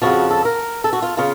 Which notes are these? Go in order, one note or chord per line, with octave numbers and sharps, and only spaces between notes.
F2 C#3 F3 F#4
A4
A#4
A4
F#4
F4
C#3 F4